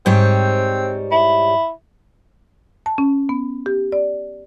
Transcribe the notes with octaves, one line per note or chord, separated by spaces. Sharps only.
G#2 G3 C4 C#5
E4
A5
C#4
B3
G4
D5